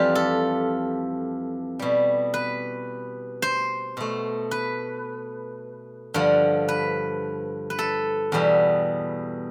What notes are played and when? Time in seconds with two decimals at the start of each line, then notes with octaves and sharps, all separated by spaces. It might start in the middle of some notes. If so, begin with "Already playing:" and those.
Already playing: F2 E3 G3 F4 G4
0.15 A4
1.79 B2 G3
2.34 B4
3.42 C5
3.97 B2 A3
4.51 B4
6.14 G2 D3 F3
6.69 B4
7.70 B4
7.79 A4
8.32 E2 B2 G3